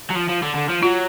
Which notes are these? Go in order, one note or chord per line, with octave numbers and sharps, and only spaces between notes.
F#3
F3
F3
D3
D3
F3
F#3 F4